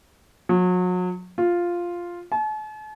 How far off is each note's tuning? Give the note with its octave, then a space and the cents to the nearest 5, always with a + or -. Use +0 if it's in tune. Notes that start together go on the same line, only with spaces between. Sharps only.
F#3 -35
F4 +0
A5 -45